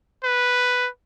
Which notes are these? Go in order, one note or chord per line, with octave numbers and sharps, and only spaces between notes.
B4